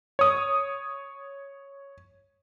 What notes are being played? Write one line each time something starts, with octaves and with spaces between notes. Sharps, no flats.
C#5 D#6